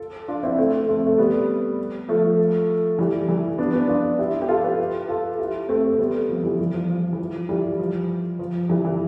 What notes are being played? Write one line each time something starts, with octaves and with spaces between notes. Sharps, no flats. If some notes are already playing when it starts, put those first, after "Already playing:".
Already playing: F4 A4
D4 F4
C4 E4
A3 C4
A3 C4
A3
G3 B3
F3 A3
E3 G3
E3 G3
B3 D4
B3 D4
D4 F4
E4 G4
G4
F4 A4
G4 B4
F4 A4
E4 G4
A3 C4
A3
G3 B3
F3
E3 G3
E3 G3
F3
F3
E3
F3
E3 G3
F3
F3
E3 G3
E3